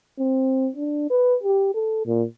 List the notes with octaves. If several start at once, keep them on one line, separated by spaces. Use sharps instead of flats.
C4
D4
B4
G4
A4
A#2